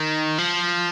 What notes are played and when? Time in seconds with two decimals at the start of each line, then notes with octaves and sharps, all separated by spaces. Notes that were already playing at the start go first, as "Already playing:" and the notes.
Already playing: D#3
0.38 F3